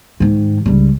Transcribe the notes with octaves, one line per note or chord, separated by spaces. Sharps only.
G#2 D#3
C#2 G3